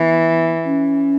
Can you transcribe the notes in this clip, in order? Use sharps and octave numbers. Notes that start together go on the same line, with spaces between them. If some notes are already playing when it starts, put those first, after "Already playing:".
Already playing: E3 B3
C#4